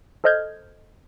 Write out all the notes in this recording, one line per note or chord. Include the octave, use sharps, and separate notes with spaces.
A4 C5 D#5 F6 G6 G#6